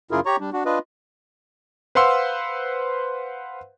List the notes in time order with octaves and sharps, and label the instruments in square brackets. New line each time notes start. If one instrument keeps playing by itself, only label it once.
[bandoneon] F#2 C#3 E4 F4 G#4 A#4
G4 C#5 A#5 C#6
G3 D4
D4 F#4
D4 F4 B4 D#5
[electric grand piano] B4 C5 F5 F#5 C6 E6